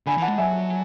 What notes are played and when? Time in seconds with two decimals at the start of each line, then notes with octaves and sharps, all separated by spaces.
0.06 D3 G#5 B5
0.18 E3 F#5 A5
0.28 G#3
0.38 F#3 E5 G#5